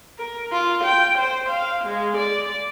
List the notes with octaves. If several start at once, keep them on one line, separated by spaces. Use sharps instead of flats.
A#4
F4
G5
C5
F5
G#3
D5